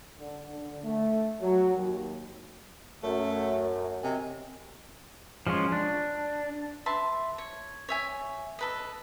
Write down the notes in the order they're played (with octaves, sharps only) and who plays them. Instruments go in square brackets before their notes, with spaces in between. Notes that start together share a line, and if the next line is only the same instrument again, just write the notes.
[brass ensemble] D3
D3
A3
F#3
D#2
[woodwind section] F#2 [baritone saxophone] A3
[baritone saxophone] C3 [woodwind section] D#5 G5 G#5
[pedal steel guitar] F3 G#3 C#4 F4
D4
[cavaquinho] B4 E5 A5 C6
C#5
C#5 E5 G#5
A4 B4 D#5